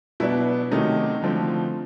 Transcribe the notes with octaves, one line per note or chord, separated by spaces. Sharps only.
B2 F#3 B3 D4 E4
C3 D#3 F#3 A3 C#4 D#4
D3 F3 A3 C4